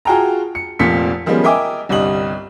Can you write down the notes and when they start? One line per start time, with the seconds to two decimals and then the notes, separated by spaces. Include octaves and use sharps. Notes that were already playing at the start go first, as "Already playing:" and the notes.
0.05 F4 F#4 G#4 G5 A5 A#5
0.55 C#7
0.79 F1 F2 A#2 F3 B6 C#7
1.26 D#3 F3 G3 G#3 B3 C#4
1.44 A#4 D#5 E5 G5 G#5 D6
1.89 G1 C2 G3 G4 D#5 F#7